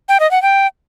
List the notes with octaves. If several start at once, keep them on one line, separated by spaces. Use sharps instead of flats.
G5
D#5
F#5
G5